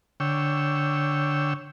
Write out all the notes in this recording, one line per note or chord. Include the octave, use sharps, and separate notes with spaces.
D3 C#5 G5 E6